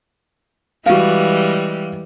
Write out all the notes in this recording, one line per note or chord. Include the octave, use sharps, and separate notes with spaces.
E3 G3 G#3 F#4 F5